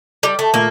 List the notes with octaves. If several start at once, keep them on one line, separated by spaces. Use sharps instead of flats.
G3
A3
A#2 A3 A#3